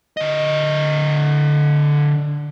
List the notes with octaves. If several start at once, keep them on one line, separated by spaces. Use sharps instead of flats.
D3 D#5